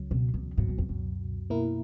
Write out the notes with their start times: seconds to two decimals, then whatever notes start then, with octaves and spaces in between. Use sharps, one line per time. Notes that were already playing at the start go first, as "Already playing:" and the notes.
Already playing: C#2 C#3 F#3
0.11 B2
0.34 E2
0.57 C#2 G#2 B2 F#3
0.68 F#2
0.78 E2
0.89 F#2
1.50 B2 A#3 E4 A#4